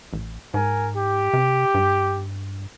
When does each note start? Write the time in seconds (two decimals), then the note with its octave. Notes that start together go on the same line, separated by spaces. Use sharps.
0.13 A1
0.54 G#2 A#4 G#5
0.95 G4
1.33 C3
1.74 G2